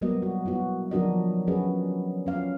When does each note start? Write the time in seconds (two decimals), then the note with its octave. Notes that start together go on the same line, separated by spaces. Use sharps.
0.01 F#3 G3 A#3 B3 F#4 D#5
0.22 F#4
0.46 B3 E4 F#4
0.91 F3 F#3 D4 F#4 A#4 D#5
1.47 F#3 C#4 F#4 G#4 B4 D#5
2.26 C#4 F5